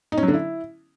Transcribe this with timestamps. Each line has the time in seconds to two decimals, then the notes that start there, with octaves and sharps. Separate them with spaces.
0.12 D#4
0.17 C#4
0.23 F#3
0.28 D3
0.34 E4